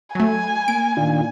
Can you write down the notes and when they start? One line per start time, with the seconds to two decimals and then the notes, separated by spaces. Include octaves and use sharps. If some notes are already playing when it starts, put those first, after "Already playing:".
0.15 F#3 A3 G#5
0.68 A#3 D7
0.97 A#2 D#3 D4 F4